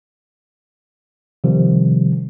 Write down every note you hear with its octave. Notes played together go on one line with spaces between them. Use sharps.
C3 D#3 F3 G3